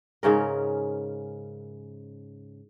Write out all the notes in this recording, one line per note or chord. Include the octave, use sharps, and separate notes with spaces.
G#2 C#3 C#4 A#4